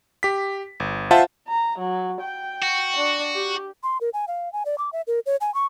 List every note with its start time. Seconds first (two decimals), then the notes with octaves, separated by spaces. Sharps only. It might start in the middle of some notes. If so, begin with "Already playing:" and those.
0.23 G4 B6
0.80 G1
1.11 F4 C5 E5 F#5 A5
1.48 A#5
1.78 F#3
2.21 G5
2.63 F#4
2.97 D4
3.35 G4
3.83 C6
4.01 A#4
4.14 G#5
4.28 F5
4.53 G#5
4.66 D5
4.78 D6
4.93 E5
5.07 A#4
5.26 C#5
5.41 G#5
5.54 C#6